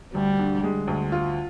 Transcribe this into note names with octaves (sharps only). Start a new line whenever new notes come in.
D2 G3
D3
G#3
D2
F4